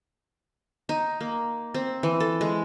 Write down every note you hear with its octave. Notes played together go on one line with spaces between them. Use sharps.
D#4
A#3
C4
E3
A4
G#3